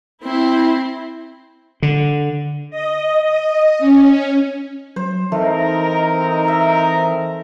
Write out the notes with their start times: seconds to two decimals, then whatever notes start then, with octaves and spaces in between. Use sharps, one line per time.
0.24 C4 E4
1.82 D3
2.70 D#5
3.23 D#5
3.79 C#4
4.96 F#3 C5
5.32 E3 A3 C4 D#4 A#4
6.48 E5